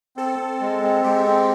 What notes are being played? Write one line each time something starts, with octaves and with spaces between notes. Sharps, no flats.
C4 A4
C4
G#3
C4
G#3 G4
C4